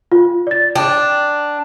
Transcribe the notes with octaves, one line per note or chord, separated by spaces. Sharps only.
F4
D5 A6
D4 G5